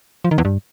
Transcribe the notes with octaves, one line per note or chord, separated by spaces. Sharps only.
F3
D#3
E2
G2